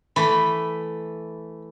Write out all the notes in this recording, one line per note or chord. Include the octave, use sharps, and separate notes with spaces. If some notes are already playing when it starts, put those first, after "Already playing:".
E3 A3 B5